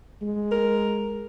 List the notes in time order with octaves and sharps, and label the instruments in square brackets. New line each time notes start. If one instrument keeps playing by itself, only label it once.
[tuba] G#3
[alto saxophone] A#4